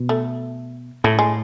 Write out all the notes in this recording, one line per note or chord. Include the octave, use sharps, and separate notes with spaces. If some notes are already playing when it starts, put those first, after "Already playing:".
Already playing: B2
A3
A2 A3
G#3